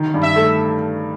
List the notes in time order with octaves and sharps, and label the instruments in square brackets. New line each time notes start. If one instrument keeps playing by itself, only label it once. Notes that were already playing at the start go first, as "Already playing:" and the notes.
Already playing: [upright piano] D#3
G2
[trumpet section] E5
[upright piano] A3